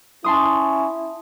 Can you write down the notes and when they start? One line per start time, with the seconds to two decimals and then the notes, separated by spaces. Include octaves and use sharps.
0.24 C#4 E4 A5 C6 D#6